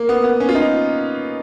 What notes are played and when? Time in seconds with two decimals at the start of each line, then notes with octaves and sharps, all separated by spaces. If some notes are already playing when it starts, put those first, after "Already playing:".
Already playing: A#3
0.09 B3
0.24 B3
0.40 C#4
0.49 F4
0.55 D#4